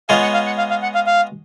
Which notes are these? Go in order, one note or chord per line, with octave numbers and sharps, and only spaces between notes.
G#3 B3 F4 G#4 C#5 F5
F#5
F5
F#5
F5
F5
F#5
F5
F5